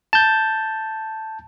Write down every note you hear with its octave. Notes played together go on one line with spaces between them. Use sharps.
A5 G6